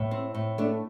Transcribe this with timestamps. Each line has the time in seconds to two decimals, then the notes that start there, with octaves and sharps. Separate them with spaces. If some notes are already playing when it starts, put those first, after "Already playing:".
Already playing: A2
0.11 C4
0.35 A2
0.58 A3 D4